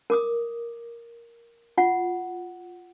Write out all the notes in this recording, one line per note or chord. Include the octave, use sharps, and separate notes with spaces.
A#4 D6 D#6
F4 F#5